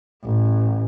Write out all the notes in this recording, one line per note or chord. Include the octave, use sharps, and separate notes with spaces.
A1